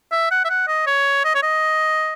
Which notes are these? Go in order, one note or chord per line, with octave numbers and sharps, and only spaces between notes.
E5
F#5
E5
F#5
D#5
C#5
D#5
C#5
D#5